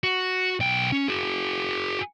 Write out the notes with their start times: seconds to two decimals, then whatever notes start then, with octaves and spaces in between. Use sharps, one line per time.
0.03 F#4
0.60 B1 G5
0.92 C#4
1.08 F#4 G#4